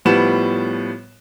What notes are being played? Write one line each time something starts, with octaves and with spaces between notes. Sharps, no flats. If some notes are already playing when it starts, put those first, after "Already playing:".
A2 F3 G3 B3 E7